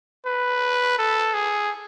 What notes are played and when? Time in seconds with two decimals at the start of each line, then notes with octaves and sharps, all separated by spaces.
0.26 B4
0.98 A4
1.34 G#4